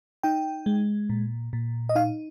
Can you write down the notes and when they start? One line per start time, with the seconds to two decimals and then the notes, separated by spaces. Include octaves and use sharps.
0.23 D#4 G5
0.66 G#3
1.10 A#2
1.53 A#2
1.89 D#5
1.95 D#4 F5